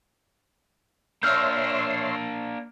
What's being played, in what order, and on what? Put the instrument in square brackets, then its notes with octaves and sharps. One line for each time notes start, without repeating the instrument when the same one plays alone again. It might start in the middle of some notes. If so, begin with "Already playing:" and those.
[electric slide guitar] A#3 D4 [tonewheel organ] C#5 E5 C6 [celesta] E6 F6 G6